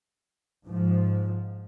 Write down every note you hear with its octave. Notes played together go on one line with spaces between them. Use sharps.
G#2 F3